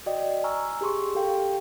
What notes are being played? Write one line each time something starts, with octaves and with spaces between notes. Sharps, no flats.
F#4 D5 D#5 G5
G#5 A#5 C#6 E6 F6
G4 G#4 C6 C#6
G4 A4 F5 G5